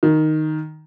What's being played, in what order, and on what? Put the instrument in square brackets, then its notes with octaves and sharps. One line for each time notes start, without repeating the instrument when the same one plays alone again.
[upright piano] D#3